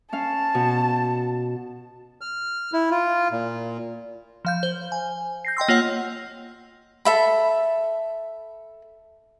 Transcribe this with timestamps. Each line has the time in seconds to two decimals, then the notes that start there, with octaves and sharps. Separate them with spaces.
0.13 C#4 F5 A5
0.55 B2
2.21 F6
2.73 E4
2.91 F4
3.31 A#2
4.45 F3 F5 G6
4.63 C5
4.92 G#5
5.45 G6 A#6 C7
5.57 D#5 G5 C6 E6
5.68 A#3 F4 C#5 F#5
7.05 A4 E5 B5